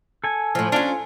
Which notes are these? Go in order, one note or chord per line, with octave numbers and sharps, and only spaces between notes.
A4 G#5
A2 F3
C#4 D4 F4